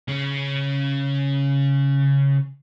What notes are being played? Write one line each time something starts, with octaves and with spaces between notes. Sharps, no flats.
C#3 C#4